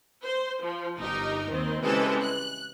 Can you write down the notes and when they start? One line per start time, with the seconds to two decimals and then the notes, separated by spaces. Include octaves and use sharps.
0.25 C5
0.63 F3
0.97 G1 D#4 G4 A#4
1.50 D#2 D#3 C4
1.83 C#3 E3 G3 G#3 C4 A4
2.23 F#6